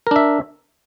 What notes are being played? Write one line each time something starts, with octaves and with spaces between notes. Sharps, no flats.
D4 A#4 E5